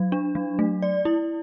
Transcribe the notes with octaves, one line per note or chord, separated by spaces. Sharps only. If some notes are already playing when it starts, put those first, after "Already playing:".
Already playing: F#3
D4
F#3
A3
D5
E4